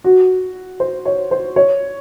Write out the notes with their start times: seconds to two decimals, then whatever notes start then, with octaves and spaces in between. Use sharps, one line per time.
0.04 F#4
0.80 C5
1.05 C#5
1.31 C5
1.56 C#5